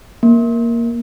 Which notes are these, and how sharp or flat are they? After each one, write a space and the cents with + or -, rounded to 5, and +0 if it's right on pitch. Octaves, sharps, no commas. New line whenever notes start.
A#3 +5